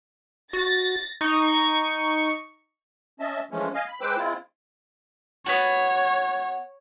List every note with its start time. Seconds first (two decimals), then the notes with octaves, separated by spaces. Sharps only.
0.53 F#4 A6 A#6
1.21 D#4 C#6
3.20 C#4 D#5 E5 A5
3.51 E3 F3 G#3 A3 C#4
3.74 D#5 F5 G#5
3.88 B5
4.01 G#3 B4 C5 G5 D6 E6
4.18 G#3 C4 E4 F4
5.46 B3 F#4 C#5